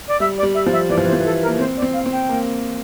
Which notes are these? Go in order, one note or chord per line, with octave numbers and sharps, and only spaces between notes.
D5
G3 E5
D5
G3
E5
F3
E5
E3 D5
F3
E3 C5
F3
E3 A4
A#4
A#3
C4 C5
D5
C4
F5
C4
G5
A#3